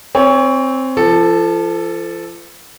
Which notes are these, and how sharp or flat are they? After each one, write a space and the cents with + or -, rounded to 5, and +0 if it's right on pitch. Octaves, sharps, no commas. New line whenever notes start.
C4 +0 C#5 +20 G#5 -40
F3 -40 A4 +0